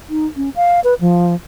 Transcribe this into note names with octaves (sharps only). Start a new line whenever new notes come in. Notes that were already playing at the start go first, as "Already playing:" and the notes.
D#4
C#4
F5
B4
F3